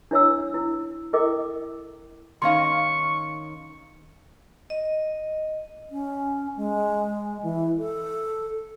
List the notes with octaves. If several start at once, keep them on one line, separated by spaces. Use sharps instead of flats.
D4 E4 C#5 F#5 E6
E4
E4 A4 A#4 D#5 G5 D6
D#3 C#4 D#4 F5 C6 C#6
D#5
C#4
G#3
E3
A4